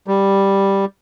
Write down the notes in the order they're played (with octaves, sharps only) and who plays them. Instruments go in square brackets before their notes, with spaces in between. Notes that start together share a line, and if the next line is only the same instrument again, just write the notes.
[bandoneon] G3